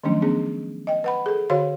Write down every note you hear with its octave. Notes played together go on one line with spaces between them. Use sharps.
D#3 F3 F#3 A3 C#4 D4
B3 C#4 D4 G#4
D#5 G5
B4 F#5 B5
G#4 A4
D3 F#4 C5 C#5 F5 C6